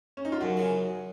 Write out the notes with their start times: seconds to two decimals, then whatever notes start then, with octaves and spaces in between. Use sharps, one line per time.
0.17 C#4
0.25 D#4
0.32 F4
0.40 F#2 F#4
0.57 C#3